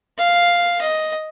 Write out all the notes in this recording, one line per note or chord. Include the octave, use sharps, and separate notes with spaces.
F5
D#5